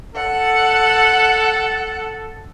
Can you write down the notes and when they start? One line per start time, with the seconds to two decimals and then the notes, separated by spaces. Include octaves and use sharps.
0.15 A4 F#5